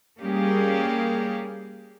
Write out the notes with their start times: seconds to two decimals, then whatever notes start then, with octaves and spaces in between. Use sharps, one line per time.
0.19 G3 A#3 C#4 G4 G#4